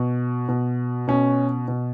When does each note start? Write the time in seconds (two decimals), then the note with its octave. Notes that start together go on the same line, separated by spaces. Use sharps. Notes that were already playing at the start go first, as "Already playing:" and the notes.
Already playing: B2
0.48 B2
1.08 B2 C#4
1.68 B2